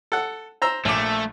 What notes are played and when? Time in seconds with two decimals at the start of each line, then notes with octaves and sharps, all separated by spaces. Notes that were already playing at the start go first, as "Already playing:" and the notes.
0.12 A4 F#5
0.62 C5 A#5 E6
0.85 A#1 A3 D6